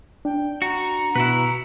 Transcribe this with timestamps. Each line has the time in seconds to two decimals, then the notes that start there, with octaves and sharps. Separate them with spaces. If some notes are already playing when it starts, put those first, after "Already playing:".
0.25 D4 G5
0.62 F#4 A#5
1.15 B2 E4 F#4 B4